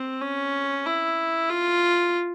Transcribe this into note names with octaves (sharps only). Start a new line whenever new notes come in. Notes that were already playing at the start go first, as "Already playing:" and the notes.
Already playing: C4
C#4
E4
F4